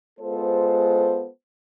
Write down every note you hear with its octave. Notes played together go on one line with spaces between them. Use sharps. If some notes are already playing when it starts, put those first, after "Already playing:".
G#3 B3 F4 A4 C5